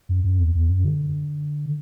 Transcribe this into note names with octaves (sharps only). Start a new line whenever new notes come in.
F#2
F#2
E2
E2
F#2
D3